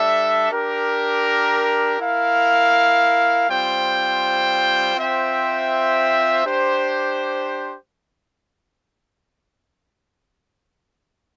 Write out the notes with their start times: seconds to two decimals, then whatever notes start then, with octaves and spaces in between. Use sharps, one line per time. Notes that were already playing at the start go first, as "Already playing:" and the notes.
Already playing: G3 D4 A4 E5
0.51 D4 G4 A#4
2.00 E4 A#4 F5
3.48 G3 C4 F4 C5 G5
4.97 C4 F4 C5 E5 G5
6.45 D4 G4 C5